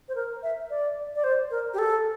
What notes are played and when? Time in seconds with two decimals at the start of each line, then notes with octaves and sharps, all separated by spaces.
0.09 C5
0.15 A#4
0.43 E5
0.70 D5
1.16 D5
1.24 C5
1.51 A#4
1.74 G4
1.78 A4